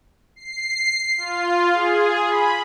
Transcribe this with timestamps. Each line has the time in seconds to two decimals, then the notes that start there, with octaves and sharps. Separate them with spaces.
0.36 C7
1.17 F4
1.73 G#4
2.29 B5